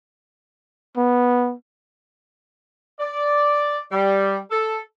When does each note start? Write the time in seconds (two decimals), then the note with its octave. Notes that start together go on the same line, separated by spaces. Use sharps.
0.97 B3
3.00 D5
3.92 G3
4.51 A4